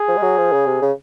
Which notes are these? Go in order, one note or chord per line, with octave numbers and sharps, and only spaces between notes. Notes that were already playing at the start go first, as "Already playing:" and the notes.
Already playing: G#4
F3
G#3
F#3
F3
C#3
C3
C#3